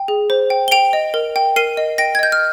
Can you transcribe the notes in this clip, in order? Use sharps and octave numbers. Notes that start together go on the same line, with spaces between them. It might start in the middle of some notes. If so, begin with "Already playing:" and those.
Already playing: G5
G#4
C5
G5
G7
G5 D7 F7
D#5
A#4
G5
A#4 C7 D#7
D#5
G5 A#6 D7
G#6
D#5 G6
F6